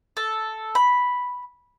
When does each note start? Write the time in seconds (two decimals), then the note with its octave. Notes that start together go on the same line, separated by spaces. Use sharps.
0.17 A4
0.75 B5